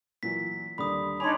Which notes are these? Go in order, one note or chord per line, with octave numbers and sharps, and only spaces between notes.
A#2 E3 F#3 B6
D#2 D3 G3 B5 D#6
D4 D#4 C#5 G#5 B5 C6 D6